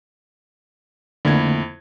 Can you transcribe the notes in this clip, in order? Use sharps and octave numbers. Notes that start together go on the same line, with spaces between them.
F2 D3 A3 A#3 E4 G#6